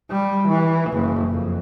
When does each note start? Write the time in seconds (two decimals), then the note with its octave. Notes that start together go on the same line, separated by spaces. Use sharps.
0.11 G3
0.48 E3
0.90 F#1
1.30 F2